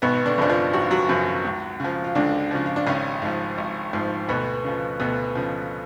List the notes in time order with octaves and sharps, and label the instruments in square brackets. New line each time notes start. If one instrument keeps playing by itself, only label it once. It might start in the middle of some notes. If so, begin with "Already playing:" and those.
[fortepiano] G#1 B2 B3
D3 D4
F#2 C#3 F3 D4
F3 F4
G#1 F#4
F4
F#3 F#4
F#2 C#3 F3
C#2
C#3 F3
F4
C#2 D3 D4
C#3 F3
F4
D4
G#1 C#3 C#4
G#2 F3
G#1
G#2 F3
D2 B2 B3
C#3 F3
D2 B2 B3
C#3 F3